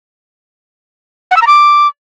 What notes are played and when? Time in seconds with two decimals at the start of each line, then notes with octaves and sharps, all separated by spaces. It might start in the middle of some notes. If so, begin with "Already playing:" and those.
1.31 F#5
1.36 E6
1.42 A#5
1.47 D6